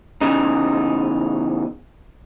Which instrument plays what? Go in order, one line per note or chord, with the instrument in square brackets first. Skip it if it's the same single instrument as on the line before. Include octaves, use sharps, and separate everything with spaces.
[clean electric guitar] E2 C#3 D#4